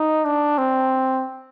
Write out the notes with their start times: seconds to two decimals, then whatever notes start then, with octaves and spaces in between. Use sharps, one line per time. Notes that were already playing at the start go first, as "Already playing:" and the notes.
Already playing: D#4
0.25 D4
0.58 C4